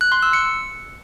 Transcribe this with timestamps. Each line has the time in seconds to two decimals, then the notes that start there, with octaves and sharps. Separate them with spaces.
0.01 F#6
0.12 C6
0.23 E6
0.33 C#7